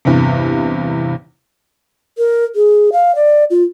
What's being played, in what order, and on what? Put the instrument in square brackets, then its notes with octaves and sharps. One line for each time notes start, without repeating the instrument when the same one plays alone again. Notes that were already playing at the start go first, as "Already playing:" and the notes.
[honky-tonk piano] E2 G2 C3
[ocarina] A#4
G#4
F5
D5
F4